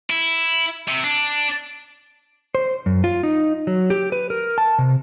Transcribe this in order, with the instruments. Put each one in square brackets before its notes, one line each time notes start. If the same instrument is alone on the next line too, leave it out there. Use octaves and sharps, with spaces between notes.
[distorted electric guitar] E4
C3
D4
[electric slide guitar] C5
F#2
F4
D#4
F#3
G4
B4
A#4
A5
C3